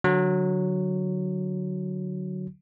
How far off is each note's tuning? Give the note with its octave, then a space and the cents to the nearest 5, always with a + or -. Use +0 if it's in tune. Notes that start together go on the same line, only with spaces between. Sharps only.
D3 +0 F#3 +0